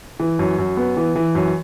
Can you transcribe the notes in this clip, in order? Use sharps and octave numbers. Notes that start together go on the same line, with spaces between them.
E3
F#2
F#2
B3
E3
E3
F#2